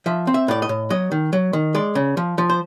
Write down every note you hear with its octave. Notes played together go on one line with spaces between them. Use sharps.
F3 E5
C4
E5
A2 D5
D#5
A2
F#3 D#5
D#3
F#3
D#3
G#3 D5
C#3
F3
F3
C5